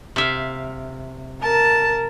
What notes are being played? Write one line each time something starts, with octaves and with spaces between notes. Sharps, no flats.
C3 E5 F5
A#4 A5